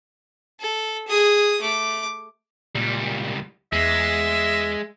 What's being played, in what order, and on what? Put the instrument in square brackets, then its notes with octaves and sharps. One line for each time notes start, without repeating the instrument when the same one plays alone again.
[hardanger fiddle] A4
G#4 D#6
A3 D6
[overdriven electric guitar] C#2 G3 [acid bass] A#2
[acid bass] E2 [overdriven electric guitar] G#3 [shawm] E5